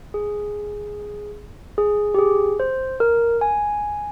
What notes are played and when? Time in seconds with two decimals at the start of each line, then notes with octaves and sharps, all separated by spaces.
0.14 G#4
1.78 G#4
2.14 G4
2.19 G#4
2.60 C5
3.00 A#4
3.41 G#5